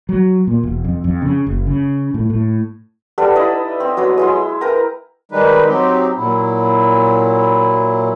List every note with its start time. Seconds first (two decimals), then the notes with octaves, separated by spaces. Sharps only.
0.09 F#3
0.47 A#2
0.63 E1
0.84 F2
1.04 F2
1.22 C#3
1.46 F#1
1.67 C#3
2.14 A2
2.30 A2
3.18 G3 A4 B4 F#5
3.35 D#4 E4 B4 D#5
3.80 C4
3.97 F#3 B3 B4 C6
4.18 G#3 E4 C6
4.61 A#4 B4 G5 A#5
5.32 D#3 G3 G#3 D#4 B4
5.67 F#3 C4 D#4 G4
6.17 A#2 F#3 E4